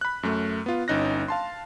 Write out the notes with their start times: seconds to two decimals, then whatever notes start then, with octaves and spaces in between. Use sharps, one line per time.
0.01 B5 F#6
0.23 F#2 A3
0.66 B3 F4
0.88 G1 C#4 D#4 F#6 A#6
1.28 F5 A5 C6